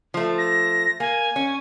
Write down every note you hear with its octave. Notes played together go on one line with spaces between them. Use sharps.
F3 A3
A#6
A#3 G#5
C#4